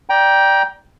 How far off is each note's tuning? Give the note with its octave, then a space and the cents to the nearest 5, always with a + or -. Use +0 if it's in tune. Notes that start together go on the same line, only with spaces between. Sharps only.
D5 +0 G5 +0 A#5 +30